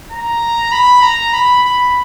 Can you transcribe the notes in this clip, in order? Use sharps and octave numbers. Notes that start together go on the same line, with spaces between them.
A#5
B5
A#5
B5
B5